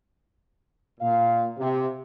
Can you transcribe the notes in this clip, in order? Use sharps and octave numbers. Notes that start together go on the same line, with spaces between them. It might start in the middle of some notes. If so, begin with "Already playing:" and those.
A#2 F5
C3